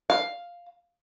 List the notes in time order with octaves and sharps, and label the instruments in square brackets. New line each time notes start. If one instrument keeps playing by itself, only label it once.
[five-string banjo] F5